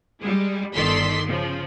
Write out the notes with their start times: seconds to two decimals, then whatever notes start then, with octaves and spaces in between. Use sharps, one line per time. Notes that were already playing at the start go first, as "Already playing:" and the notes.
0.21 G3 G#3
0.74 G1 D#3 A4 D5 C6 B6
1.26 C#3 F3